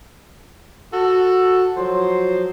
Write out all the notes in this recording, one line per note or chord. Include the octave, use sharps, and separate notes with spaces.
F#4 A4
F3 F#3 C5